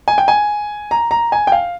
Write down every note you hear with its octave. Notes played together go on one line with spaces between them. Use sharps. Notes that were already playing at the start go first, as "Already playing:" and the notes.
G#5
G5
G#5
A#5
A#5
G#5
G5
F5